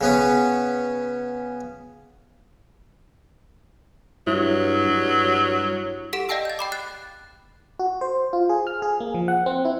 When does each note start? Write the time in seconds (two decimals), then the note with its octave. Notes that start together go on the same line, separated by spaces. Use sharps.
0.01 C#3 B3 C#4
4.27 G2 F#3 E4
4.90 G2
6.13 G4 A4 F#5 B6 D7 E7
6.29 D5 D#5 F5 G5 A5 E6
6.45 G6 A6
6.59 G5 B5 D6
6.72 F#6 A6 C7
7.80 F#4
8.01 C5
8.33 F4
8.49 G#4
8.67 F6
8.82 G#4
9.00 A#3
9.14 F3
9.28 F#5
9.46 C4
9.65 E4